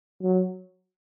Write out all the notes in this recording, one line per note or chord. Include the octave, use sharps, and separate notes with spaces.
F#3